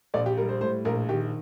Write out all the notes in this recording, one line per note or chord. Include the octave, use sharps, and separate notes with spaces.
A#1 D5
G4
G3 A#4
C5
A2 C5
A#1 A#4
D#3 G4